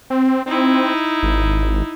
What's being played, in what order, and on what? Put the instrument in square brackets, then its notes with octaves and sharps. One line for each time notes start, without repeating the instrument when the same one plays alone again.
[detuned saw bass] C4
[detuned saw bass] C4 [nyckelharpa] D#4 E4
[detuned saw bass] G#1